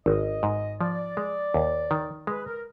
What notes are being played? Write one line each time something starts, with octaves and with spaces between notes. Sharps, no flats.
G#1 D#5
G#2
F3 D5
G#3
D#2
D#3
G#3 B4
A#4